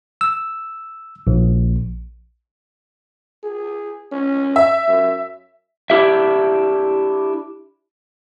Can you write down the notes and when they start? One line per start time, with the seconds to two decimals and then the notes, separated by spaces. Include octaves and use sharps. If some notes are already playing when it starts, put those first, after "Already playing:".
0.21 E6
1.27 A#1
3.44 G#4
4.12 C#4
4.56 E5
4.87 F#2
5.90 D4 E4 G4 E5